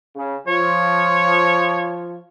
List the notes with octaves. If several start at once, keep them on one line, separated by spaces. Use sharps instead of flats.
C#3
F3 C#5